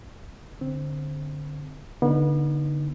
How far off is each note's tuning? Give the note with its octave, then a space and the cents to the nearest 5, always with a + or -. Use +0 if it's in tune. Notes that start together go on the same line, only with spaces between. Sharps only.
D3 +0 C4 +0
D3 -15 B3 -30 D#4 +0